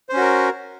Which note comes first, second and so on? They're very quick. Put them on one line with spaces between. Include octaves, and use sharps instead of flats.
C5 C#4 F#4 A#4